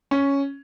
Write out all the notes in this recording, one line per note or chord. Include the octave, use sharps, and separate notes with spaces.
C#4